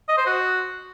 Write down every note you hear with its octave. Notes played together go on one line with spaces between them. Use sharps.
D#5
C5
F#4